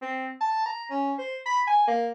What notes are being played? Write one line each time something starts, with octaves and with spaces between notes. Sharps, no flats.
C4
A5
A#5
C#4
C5
B5
G#5
A#3